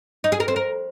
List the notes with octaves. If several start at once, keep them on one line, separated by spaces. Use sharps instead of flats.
D#4
G#4
A#4
C4
A#4